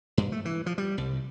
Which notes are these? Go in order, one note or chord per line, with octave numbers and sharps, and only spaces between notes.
G2
A3
E3
F3
G3
C2